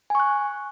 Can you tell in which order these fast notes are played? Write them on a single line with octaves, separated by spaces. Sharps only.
G#5 C#6 F#6